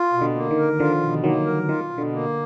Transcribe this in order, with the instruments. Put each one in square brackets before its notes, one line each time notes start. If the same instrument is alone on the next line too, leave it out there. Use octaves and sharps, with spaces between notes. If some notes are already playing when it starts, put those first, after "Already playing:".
Already playing: [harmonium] F4
B2
[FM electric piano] D3
[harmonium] A#3
[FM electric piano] D#3
[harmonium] A#4
[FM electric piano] D3 F3 [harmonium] F4
[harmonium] B2
[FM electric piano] D#3 F#3 [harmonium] A#3
[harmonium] A#4
[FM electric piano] D#3 [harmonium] F4
[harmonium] B2
[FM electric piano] D3
[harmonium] A#3